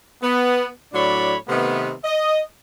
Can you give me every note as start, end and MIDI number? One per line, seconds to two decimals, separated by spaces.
0.22 0.66 59
0.94 1.36 45
0.94 1.36 54
0.94 1.36 62
0.94 1.36 73
0.94 1.36 74
0.94 1.36 83
1.48 1.93 48
1.48 1.93 51
1.48 1.93 57
1.48 1.93 59
2.05 2.41 75